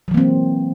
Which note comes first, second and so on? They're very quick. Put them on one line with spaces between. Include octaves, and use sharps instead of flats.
F#3 E3 A#3 C4